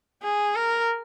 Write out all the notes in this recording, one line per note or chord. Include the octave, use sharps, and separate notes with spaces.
G#4
A#4